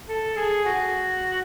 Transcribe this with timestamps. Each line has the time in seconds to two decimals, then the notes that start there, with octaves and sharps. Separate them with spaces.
0.08 A4
0.36 G#4
0.65 F#4